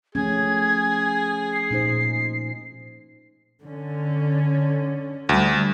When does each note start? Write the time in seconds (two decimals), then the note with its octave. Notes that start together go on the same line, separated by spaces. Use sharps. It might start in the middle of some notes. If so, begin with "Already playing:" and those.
0.15 F3 A3 C#4 G#4 G#6
1.53 C7
1.71 A#2 D#4 C5
3.62 D3 C#4
5.29 D2 G3